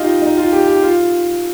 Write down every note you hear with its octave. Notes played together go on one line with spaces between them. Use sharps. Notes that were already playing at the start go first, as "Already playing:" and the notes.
Already playing: D#4 F4 G4
D#4
F4
G4
G4
F4